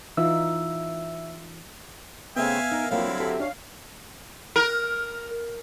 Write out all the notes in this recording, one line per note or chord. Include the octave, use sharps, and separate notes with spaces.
E3 D#4 F4 E5 E6
C#3 A3 B3 C4 E5 F5 G#5
D#4 A#4
D3 F3 F#3 A#3 C4 E4 F4 F5
G3
F#4 G4 A4 E5
D4 C#5 F5
A#4